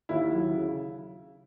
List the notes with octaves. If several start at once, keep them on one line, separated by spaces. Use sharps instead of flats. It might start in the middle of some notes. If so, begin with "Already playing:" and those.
D#2 E4
F#3
C#3